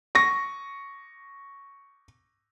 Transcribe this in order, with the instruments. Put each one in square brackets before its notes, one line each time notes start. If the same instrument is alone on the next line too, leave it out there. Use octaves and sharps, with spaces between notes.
[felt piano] C#6 A#6